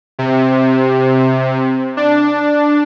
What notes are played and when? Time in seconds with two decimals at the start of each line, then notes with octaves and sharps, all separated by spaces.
0.19 C3
1.97 D4